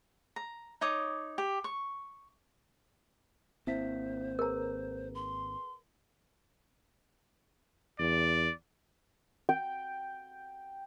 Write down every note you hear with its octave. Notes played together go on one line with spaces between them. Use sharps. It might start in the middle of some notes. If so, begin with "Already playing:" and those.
A#5
D#4 C#5 D6 D#6
G4
C#6
G#1 A#3 C4 E4 C5 E5 B6
G#4 A#4 B4 A#5
C6
E2 D5
G5